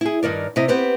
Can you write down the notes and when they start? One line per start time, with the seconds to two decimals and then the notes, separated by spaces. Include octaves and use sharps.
0.01 E4 G#4
0.23 G2 D#3 A#4 D5
0.56 C3 E4 D#5
0.68 B3 C4 G4 B4